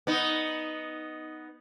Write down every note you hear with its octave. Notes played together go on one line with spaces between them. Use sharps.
B3 D#4